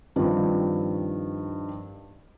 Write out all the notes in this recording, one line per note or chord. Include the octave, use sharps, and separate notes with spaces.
G2 D#3 F3 C4